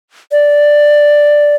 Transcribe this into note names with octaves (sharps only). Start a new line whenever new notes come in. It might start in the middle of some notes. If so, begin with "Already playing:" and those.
D5